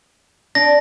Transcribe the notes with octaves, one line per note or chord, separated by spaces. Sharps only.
D4 A#6